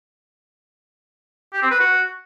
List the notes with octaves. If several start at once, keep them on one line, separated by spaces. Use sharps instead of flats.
G4
C4
B4
F#4